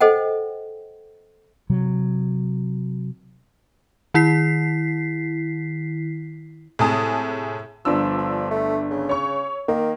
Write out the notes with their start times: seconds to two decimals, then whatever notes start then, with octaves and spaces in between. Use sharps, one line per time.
0.01 A4 C5 D#5 F#5 G5
1.70 C3 F#3
4.14 D#3 E4 B6 C7
6.79 A2 C3 G#3 G#4 A5 D#6
7.85 G1 F3 D4 E6
8.17 F3
8.51 A3
8.91 C#3
9.09 C#5 C#6
9.68 D#3 A#3